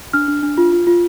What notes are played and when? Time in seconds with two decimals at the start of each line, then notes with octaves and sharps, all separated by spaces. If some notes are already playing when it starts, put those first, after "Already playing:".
0.13 D4 F6
0.28 D4
0.43 D4
0.58 F4
0.72 F4
0.87 F4